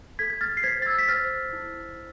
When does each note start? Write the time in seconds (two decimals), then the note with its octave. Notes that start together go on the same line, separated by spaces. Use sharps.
0.19 A4 G#6 B6
0.30 G#6
0.41 F6 A6
0.57 C7
0.63 C5 G#6 B6
0.82 A6
0.86 E6 G#6
0.98 B6
1.08 C5 F6 A6
1.53 E4